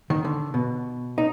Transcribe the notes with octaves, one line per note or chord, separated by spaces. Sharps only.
D#3
D3
B2
D#4